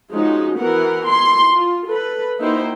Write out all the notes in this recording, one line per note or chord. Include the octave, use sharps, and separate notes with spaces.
F3 G#3 C#4 D#4 F#4
E3 B3 F#4 A#4 F#5
E4 C6
F4
A4 B4
A#3 D#4 E4 F#4 C5 G5